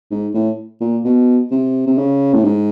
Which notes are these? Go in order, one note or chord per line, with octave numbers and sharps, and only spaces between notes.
G#2
A2
A#2
B2
C3
C3
C#3
A2
G#2